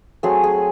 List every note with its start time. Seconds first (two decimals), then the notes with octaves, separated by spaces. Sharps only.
0.23 F#3 A3 C4 G#4 G#5
0.44 G#4 G#5